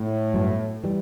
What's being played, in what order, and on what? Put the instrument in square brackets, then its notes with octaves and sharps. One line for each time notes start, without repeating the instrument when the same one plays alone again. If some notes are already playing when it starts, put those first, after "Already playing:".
Already playing: [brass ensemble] A2
[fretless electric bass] G2 F#3 B3
E3 G3